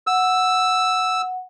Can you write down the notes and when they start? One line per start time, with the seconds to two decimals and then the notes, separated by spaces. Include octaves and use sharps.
0.07 F#5 E6